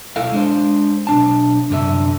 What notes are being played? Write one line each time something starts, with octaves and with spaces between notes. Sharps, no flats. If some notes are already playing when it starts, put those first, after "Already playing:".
B1 E4 A4 F5
G#3 D4 C5
B1 D4 A5
C2 F#2 D3 D4 E5